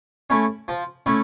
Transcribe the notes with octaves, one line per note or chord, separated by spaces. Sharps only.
A3 C#4 E4
F3
A3 C#4 E4